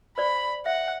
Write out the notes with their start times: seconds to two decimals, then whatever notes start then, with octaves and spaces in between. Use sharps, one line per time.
0.18 C5 D5 B5
0.66 E5 F#5